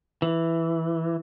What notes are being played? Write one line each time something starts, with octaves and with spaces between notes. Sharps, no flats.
E3